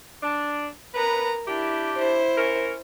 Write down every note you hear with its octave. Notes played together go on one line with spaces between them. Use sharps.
D4
B3 C#4 A#4 B4 A#5
D4 E4 G4
E4 C5
C#4 A#4